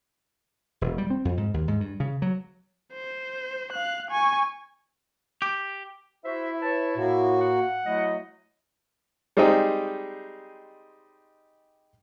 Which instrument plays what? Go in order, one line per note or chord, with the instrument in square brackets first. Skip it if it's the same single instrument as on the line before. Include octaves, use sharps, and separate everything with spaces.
[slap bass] E1
G3
C4
F2
G#2
D#2
G#2
G2
C#3
F#3
[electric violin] C5
F5 F#6
G#5 C#6
[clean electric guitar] G4
[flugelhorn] E4 [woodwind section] F#4 C5 E5
[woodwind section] B4 C#5 A5
[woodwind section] A2 [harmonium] A#3 F#4
[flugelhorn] F#5
[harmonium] F#3 [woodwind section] A3 E4 D#5
[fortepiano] G3 G#3 C4 D#4 G#4 G5